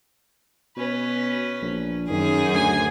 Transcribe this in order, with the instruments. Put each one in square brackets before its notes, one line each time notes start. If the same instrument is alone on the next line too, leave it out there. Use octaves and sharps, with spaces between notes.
[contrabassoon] B2 [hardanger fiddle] C#4 B4
[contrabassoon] A#1
[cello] F#2 G#4 [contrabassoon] D#3
[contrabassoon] D2 [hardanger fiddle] G#5